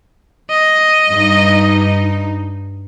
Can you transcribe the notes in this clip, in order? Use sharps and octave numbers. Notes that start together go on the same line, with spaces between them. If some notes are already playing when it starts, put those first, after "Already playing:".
D#5
G2 D#4